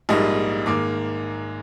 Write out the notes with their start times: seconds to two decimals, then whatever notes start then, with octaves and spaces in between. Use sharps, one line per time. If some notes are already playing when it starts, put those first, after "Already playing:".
0.09 A#1 G#2 G3 A#3 D#5
0.66 G#2 D#3 A#3 D6